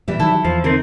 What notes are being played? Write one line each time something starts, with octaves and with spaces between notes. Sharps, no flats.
A#2 E3 G3 E5
D#3 F#3 E4 A4
E2 F3 C5
D3 C4 D#4 A#4